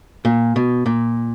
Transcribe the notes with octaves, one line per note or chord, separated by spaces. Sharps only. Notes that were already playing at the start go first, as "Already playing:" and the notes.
A#2
B2
A#2